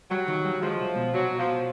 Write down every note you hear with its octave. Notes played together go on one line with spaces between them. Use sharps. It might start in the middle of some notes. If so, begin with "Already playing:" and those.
F#3 G3
D#3
G3
F3 G#3
C2
B2
B2 F#3
B2
F3
B2